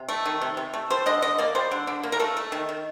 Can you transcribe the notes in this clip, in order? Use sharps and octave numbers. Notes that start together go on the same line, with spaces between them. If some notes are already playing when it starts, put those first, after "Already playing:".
Already playing: C3
A3
D#3
C3
C3
A3
G3 C5
D3 D#5
D3 D#5
A#3 D5
G3 C5
D3
D3
A#3
A#4
A3 A4
A3
D#3
D#3